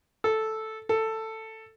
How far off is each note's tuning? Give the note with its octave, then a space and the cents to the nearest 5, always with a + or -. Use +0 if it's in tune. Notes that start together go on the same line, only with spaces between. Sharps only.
A4 -5
A4 +10